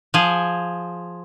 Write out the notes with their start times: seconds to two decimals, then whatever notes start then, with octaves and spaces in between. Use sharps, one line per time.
0.14 F3 G#4